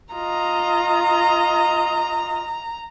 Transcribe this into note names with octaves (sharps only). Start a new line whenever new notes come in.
F4 D#5 A#5